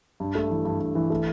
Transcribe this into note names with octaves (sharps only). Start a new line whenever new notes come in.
G2
A3
E3
G2
G2
E3
A3